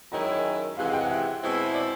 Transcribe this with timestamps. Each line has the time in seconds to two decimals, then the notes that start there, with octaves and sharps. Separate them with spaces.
0.12 F#2 D#3 G#3 C#4 E4 A#5
0.77 C3 E3 G#3 F5
0.85 F#5
0.93 G5
1.01 F#5
1.10 E5
1.42 B2 G#3 C4 E4
1.74 D5